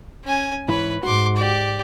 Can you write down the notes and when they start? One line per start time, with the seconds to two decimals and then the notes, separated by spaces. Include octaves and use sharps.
0.24 C#4 G#5
0.68 G#2 E3 E4 B4 C#5
1.03 G#2 F#4 C6 D6
1.36 G4 D5